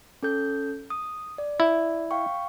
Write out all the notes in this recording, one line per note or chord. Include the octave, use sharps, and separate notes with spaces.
C#4 A4 G6
D#6
D5
E4
F5 G5 C#6